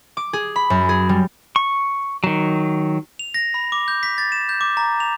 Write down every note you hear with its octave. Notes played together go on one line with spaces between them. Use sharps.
D6
G#4
B5
F#2
G#4
G3
C#6
D#3 F#3
F7
A#6
B5
D6
G6
B6
A6
E7
G6
D6
A#5
F7